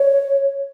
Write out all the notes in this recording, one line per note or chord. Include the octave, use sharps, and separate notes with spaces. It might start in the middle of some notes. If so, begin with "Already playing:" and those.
Already playing: C#5